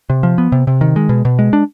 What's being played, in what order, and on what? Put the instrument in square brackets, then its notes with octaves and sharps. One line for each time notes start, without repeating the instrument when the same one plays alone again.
[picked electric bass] C3
F3
B3
C3
C3
D#3
G#3
B2
B2
G#3
D4